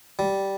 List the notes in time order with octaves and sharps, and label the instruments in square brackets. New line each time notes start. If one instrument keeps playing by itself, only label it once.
[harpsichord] G3